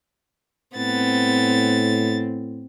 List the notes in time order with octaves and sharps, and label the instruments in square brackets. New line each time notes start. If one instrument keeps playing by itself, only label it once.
[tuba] A2 [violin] B3 A6 [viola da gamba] C4